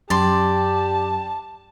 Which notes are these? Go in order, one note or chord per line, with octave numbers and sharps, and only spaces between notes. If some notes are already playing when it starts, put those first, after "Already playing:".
F#2 G4 D5 A5 C6